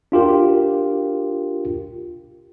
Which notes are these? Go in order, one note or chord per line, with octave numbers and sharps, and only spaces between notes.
D4 F4 G4 A#4